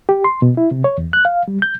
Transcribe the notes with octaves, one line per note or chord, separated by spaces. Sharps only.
G4
C6
B2
E4
C3
C#5
E2
F#6
F5
G3
G6